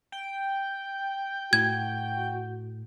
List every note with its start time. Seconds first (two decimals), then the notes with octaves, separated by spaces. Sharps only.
0.12 G5
1.53 A2 F#4 G#6